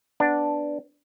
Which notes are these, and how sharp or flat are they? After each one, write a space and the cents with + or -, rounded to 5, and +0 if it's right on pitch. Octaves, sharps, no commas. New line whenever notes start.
B3 +0 D4 +0